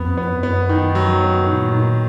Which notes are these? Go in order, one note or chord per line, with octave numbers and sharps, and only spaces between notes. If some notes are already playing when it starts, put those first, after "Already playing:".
Already playing: F2 B3
B3
F#2
B3
D#3
F#3
B3
A#2 D#3
D#3